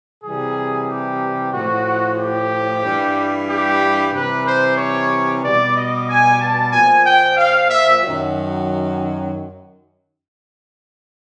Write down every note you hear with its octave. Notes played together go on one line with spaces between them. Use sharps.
C3 E3 G3 G#4
G4
A2 F3 F#4
G4
G2 E3 G3
G4
C3 E3 G3 B4
C5
C#5
B2 G3 D5
D#5
G#5
A5
A#2 F3 G#5
G5
F5
E5
F#2 D#3 F#3